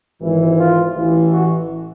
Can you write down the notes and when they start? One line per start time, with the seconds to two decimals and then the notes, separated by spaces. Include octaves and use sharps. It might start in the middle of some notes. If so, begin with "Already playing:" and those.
0.21 G#1 G#2 E3
0.58 F4
0.95 A1 A2 E3
1.33 F#4